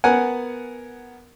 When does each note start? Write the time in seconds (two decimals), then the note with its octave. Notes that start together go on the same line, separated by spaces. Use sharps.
0.04 B3 A#4 F#5 G#5